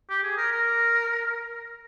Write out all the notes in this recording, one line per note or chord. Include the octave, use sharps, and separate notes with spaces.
G4
G#4
A#4
A#4